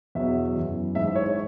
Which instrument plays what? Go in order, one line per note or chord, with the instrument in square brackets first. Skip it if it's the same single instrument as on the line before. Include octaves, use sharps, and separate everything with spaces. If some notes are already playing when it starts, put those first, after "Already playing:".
[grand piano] E2 B2 F#3 E5
F#2 E3
G#2 E3 E5
C#5